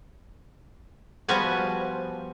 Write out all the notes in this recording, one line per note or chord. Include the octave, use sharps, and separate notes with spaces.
F3 G3 B3 F#4 G#5